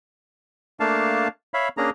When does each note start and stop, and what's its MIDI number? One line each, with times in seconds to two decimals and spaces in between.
0.80 1.28 57
0.80 1.28 58
0.80 1.28 62
0.80 1.28 77
0.80 1.28 81
1.54 1.69 73
1.54 1.69 76
1.54 1.69 77
1.54 1.69 83
1.77 1.90 58
1.77 1.90 61
1.77 1.90 62
1.77 1.90 68
1.77 1.90 82